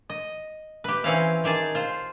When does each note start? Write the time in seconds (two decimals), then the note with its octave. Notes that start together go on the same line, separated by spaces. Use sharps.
0.10 D#5
0.84 G4 B4
1.04 E3 C4 C#4 F5
1.44 D#3 G4 G#4 A5
1.75 F4 C5